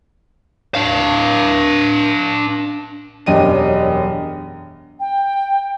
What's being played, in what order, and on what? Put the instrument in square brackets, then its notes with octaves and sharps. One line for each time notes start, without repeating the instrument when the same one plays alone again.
[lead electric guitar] D4 F5
[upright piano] E1 F#2 D4 G4 D#5 D#7
[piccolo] G5